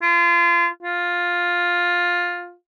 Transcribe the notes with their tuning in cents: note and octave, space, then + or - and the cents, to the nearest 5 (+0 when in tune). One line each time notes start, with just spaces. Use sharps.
F4 -30
F4 +10